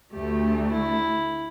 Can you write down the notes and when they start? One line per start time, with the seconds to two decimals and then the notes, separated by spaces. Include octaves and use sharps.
0.13 D2 A3 G4
0.72 E4